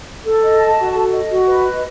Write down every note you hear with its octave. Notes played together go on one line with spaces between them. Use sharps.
A4
D#5
A5
F#4
A4
D#5
F#4
B4
D#5